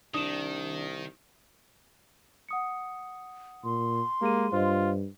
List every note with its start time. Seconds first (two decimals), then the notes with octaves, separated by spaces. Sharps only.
0.14 C2 D#3 D4 D#6 E7
2.49 F#5 D#6 C#7
3.64 A#2 C6
4.21 G#3 A#3 G4 G#4 D#7
4.52 G2 F4 C5 D#5